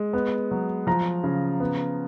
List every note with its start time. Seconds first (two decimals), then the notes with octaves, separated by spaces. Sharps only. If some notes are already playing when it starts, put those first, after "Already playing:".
Already playing: G#3
0.13 B3
0.51 F#3
0.87 F3 A#5
1.24 C#3
1.60 B3